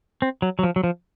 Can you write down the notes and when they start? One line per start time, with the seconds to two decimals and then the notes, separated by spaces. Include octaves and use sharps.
0.22 C4
0.42 F#3
0.59 F#3
0.63 F3
0.76 F#3
0.84 F3